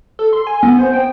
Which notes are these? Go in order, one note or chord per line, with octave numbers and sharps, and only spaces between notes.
A4
C6
G#5
B3
C5
G5